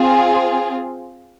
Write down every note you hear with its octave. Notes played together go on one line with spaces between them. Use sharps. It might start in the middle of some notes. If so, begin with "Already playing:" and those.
Already playing: C4 F4 G#4